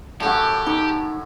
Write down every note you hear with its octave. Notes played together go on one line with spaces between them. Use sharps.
F#2 A2 G4 A4 F#5
D#4